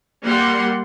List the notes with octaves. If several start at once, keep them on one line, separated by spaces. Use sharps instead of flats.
G3 A#3 F#5 C6